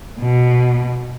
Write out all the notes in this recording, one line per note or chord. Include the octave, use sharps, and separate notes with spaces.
B2